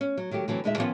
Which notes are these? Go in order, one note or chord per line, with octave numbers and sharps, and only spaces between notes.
C#4
F#3
D#3 F#3 A3 G4
D3 E3 F#3 C4
D2 A#2 G#3 D#4 D#5 E5
D#3 F3 G3 B3 C#4 F4